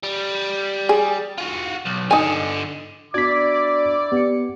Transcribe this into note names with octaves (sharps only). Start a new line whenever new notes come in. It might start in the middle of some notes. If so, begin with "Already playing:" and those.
G3
G#4
F4 F#4
B1
G2 D3 D#4 G#5
B3 D4 E4 F#4 D5 D6 G#6 B6
B3 G4 C#7